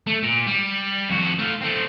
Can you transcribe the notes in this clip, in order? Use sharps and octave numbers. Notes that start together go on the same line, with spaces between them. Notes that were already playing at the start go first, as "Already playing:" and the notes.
A3
A#2
G3
F2 F#4
A3 F4
A3 C4